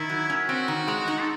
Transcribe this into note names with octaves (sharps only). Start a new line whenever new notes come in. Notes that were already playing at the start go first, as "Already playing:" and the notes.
Already playing: D#3 E4
F#3
C#4
C4 F#4
D#3
G#3
D#4
A4